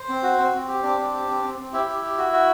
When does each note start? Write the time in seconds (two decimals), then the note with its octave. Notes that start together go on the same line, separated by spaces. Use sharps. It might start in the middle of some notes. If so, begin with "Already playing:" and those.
Already playing: C5
0.09 C4
0.23 F#4
0.38 C4
0.53 C4
0.68 G4
0.83 C4 D4 D5
0.98 C4
1.13 G4
1.27 C4
1.43 C4
1.58 C4
1.72 E4 G4 E5
1.88 G4
2.03 G4
2.18 F#4
2.33 F#4